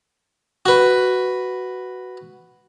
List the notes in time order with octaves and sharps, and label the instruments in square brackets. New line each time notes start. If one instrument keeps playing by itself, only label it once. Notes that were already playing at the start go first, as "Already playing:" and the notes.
[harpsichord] F#4 B4